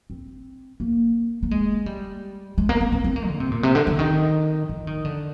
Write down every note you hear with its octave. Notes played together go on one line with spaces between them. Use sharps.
C4
A#3
A#3
G#3
G3
G#3
A#3
C4
C4
C4
A#3
D3
C3
A#2
C3
D3
D3
D#3
F3
D#3
D3